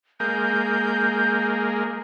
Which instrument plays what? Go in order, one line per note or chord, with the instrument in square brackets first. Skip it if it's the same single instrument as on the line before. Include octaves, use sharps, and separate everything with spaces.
[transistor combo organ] G#3 A#3 [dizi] G6